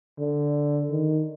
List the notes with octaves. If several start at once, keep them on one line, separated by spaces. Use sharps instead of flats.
D3
D#3